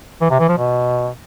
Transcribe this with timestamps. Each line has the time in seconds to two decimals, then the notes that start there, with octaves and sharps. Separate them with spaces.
0.21 E3
0.31 C3
0.40 E3
0.49 F3
0.58 B2